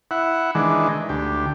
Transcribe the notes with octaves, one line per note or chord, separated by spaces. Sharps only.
E4 F#5
D#3 E3 G#3 D4
D2 G4